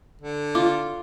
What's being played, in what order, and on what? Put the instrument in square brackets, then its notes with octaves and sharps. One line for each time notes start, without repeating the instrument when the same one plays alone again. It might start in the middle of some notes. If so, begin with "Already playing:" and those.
[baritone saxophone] D3
[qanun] F4 [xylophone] D6